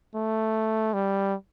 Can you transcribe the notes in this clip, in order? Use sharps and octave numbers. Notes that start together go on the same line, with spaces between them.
A3
G3